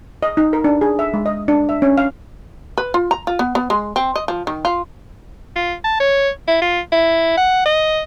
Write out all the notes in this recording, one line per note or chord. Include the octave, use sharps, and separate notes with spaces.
D#5
D#4
A#4
D4
G#4
E5
G#3
D#5
D4
E5
C#4
F5
B4
F4
A#5
F4
B3
B3
G#3
C4
D#5
F3
D#3
F4
F4
A5
C#5
E4
F4
E4
F#5
D#5